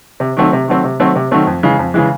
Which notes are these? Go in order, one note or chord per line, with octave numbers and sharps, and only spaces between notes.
C3
D#3 F#3 A3 C4
C3
D#3 F#3 A3 C4
C3
D#3 F#3 A3 C4
C3
D#3 F#3 A3 C4
F2
C#3 E3 G#3
F2
C#3 E3 G#3